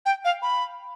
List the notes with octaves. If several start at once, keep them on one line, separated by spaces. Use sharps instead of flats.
G5
F5
B5